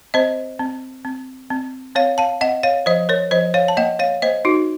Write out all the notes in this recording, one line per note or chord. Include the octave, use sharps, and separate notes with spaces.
C4 C5 D#5
C4
C4
C4
C4 C#5 F5
F5 A5
C4 D#5 F#5
C#5 F5
F3 C5 D#5
A#4 C#5
F3 C5 D#5
C#5 F5
A5
A#3 D#5 F#5
C#5 F5
A#3 C5 D#5
D#4 F#4